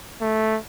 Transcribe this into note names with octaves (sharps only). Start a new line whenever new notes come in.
A3